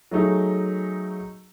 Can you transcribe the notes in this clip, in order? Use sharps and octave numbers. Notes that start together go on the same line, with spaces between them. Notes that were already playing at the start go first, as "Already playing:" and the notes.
F#3 A3 D#4 G#4